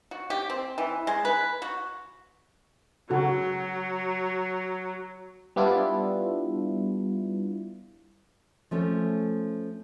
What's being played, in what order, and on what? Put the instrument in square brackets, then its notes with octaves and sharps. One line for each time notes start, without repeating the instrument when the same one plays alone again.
[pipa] F#4
G4
C4
E3
G#3
B4
F#4
[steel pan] C#3 F#4 A4 [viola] F#3
[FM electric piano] G3 B3 D4 E4 F4
[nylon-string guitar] F3 A3 C#4